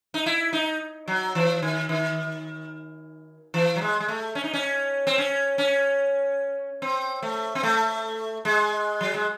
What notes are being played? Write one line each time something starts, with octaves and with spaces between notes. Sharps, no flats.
D#4
E4
D#4
F#3
E3
D#3
D#3
E3
F#3
G#3
G#3
A3
C#4
D#4
C#4
C4
C#4
C#4
C4
A3
C4
A3
G#3
F#3
G#3